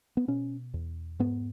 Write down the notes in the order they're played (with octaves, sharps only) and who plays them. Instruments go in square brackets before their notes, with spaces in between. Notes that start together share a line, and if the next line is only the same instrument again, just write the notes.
[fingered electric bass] B3
B2 C#4
E2
G#2 B3